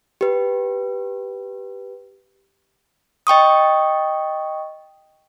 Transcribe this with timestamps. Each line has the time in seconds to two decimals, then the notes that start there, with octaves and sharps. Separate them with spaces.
0.21 G4 B4
3.27 D#5 G5 C#6 D#6